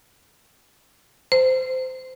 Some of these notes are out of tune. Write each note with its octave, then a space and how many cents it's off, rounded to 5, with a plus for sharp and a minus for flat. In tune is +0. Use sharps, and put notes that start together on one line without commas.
C5 -20